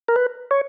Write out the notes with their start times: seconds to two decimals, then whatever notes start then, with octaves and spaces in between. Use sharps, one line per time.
0.08 A#4
0.16 B4
0.51 C#5